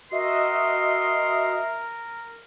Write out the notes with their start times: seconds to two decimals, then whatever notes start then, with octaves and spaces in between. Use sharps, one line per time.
0.11 F#4 A#4 D#5 E5 C6